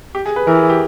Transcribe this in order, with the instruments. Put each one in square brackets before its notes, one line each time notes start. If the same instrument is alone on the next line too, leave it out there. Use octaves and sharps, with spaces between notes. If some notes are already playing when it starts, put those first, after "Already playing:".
[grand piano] G4
G#4
B4
[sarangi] E3 [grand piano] A#4
[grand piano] G#4
G4